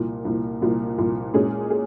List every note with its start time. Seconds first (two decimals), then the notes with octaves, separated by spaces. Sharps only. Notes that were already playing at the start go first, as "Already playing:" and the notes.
Already playing: C2 A#2 F3
0.24 C2 A#2 F3
0.61 C2 A#2 F3
0.98 C2 A#2 F3
1.34 A#2 G#3 C#4 G#4
1.70 G#4